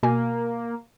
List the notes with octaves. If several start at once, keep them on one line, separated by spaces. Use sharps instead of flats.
B2 A#3 G#5